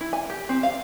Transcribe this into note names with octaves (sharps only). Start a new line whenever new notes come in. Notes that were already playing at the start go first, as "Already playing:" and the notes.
E4
G#5
G4
C4
F5